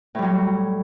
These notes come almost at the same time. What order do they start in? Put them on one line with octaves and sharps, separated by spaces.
A2 G3 F#3